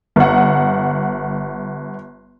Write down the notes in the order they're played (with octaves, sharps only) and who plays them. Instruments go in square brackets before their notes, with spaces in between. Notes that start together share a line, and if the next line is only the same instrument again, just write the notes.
[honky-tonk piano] G1 F#5